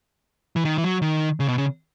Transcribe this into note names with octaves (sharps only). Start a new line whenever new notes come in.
E3
D#3
E3
F#3
D#3
C#3
B2
C#3